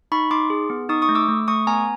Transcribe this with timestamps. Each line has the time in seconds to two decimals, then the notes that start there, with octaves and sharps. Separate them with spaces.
0.12 D#4 B5 C#6
0.31 D#4 C6 D6
0.50 G#4
0.70 B3
0.89 D#4 C#6 D#6
1.02 C#6 D#6
1.09 A3
1.15 D6 E6
1.28 A3
1.48 A3 C#6 D#6
1.67 B3 G#5 A#5